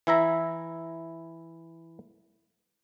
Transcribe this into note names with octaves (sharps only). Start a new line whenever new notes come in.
E3 E4 E5 A#5